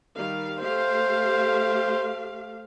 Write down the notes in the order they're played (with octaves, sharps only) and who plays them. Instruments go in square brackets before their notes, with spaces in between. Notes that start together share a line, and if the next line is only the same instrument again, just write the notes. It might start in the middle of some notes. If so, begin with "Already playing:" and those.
[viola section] D#3 G3 F5
[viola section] A3 G4 F5 [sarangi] C5